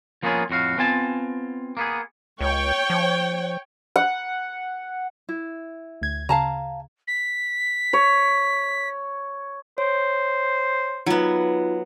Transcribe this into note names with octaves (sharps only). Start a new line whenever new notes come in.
F3 A#3 B3 C#4 F4 G#4
F2 A2 F#4 F5
B3 C4 F4 G#5 A5
A#3 B3 G#4
C#2 C#5 G5
F3
F#5
E4
D2 G#6
C#3 F5 A5 A#5
B6
C#5
C5 C#5
F#3 B3 D#4 F4